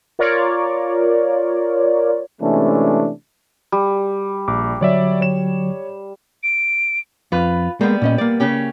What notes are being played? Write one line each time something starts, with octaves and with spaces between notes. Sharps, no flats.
F4 A#4 C#5 D5
C3 E3 G#3 A3 C#4 D4
G3
A#1 D6
D3 F#3 C#5 D5 E5
C#5 E7
D7
F2 F4 B4
G3 G#3 A#3 B3
A#2 C#4 D#5
A#3 D5
C#3 C#4 G4